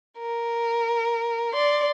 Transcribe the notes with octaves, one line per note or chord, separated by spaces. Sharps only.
A#4
D5 C6